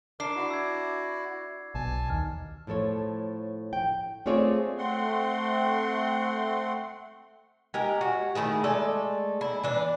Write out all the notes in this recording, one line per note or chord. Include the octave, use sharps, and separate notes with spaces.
D4 A#4 D6 C7
E4 F#4
E6 G#6
B1 G#5 A5
D#2 F6
A2 F3 A4 C#5
G5
A3 C4 F4 G#4 C#5 D5
A3 C4 F#5 C6
G#3 G4 A#4
F#4
D#3 A3 E4 G#4
G#3 A3 A4 D5
E4
E3 D4